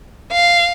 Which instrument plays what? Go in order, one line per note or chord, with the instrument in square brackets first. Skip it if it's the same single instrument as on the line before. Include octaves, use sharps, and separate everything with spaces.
[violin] F5